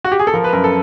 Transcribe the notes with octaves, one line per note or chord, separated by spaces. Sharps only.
F#4
G4
G#4
A4
F3 A#4
B4
F#2 A#4
A4